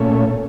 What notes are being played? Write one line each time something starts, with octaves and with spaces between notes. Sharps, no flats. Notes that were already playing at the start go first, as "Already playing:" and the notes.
Already playing: A#2 A3 C#4